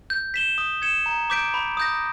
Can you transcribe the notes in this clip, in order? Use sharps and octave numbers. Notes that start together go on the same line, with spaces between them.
G6
B6 E7 G7
D#6
G#6 C#7 E7 G7
A#5
D6 G6 B6 D7
B5
D#6 G6 A#6